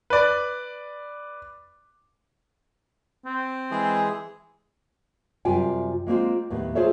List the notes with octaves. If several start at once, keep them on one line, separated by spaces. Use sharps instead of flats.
B4 D5
C4
E3 G#3 G#4
F#2 C3 G3 F4 G5 G#5
G#3 A#3 C4 F4
D#2 A2 B3
F4 G#4 A4 C5 C#5 E5